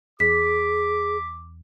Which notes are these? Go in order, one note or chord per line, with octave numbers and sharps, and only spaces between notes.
E2 G#4 D6 B6